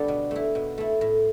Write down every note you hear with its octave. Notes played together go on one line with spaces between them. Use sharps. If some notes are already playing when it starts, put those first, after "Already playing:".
Already playing: D3 G3 B3 D4 A4
B2
A3 E4
B2
A3 E4
A2